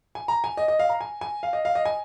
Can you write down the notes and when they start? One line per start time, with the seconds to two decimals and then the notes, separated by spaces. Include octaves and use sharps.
0.15 G#5
0.28 A#5
0.44 G#5
0.57 D#5
0.68 D#5
0.79 F5
0.89 A#5
1.01 G#5
1.21 G#5
1.43 F5
1.53 D#5
1.65 F5
1.75 D#5
1.86 G#5